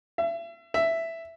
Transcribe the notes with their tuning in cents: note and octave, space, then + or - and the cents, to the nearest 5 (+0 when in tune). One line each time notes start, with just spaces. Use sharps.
E5 +35
E5 +5